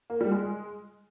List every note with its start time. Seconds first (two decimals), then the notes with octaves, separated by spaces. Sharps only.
0.10 A#3
0.21 G3
0.32 G#3